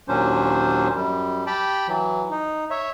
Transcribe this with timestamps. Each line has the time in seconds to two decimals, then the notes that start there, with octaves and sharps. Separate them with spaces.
0.08 D#2 A#2 F#3 C#4 D4 C5
0.95 F#2 G3
1.46 G4 G5 A5 B5
1.88 E3 F#3
2.30 D#4
2.70 C#5 E5